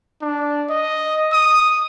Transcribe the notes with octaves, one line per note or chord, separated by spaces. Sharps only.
D4
D#5
D#6